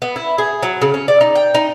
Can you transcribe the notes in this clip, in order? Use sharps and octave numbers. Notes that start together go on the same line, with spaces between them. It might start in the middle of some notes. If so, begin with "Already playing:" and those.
B3
E4
G#4
F#3
C#3
C#4
D5
D#4
G5
D#4